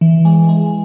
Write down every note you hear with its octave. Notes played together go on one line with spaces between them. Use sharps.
E3
G#3
G#3